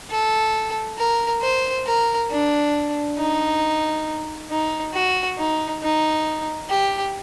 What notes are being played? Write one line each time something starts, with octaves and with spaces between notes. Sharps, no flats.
A4
A#4
C5
A#4
D4
D#4
D#4
F#4
D#4
D#4
G4